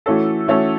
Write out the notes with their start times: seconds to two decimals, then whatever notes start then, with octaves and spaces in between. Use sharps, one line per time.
0.06 E3 A3 C#4 F#4 A4
0.47 E3 A3 C#4 F#4 A4